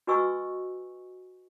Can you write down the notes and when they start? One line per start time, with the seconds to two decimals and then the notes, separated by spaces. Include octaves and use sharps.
0.07 F#4 B4 D#5 G#5 C#6 E6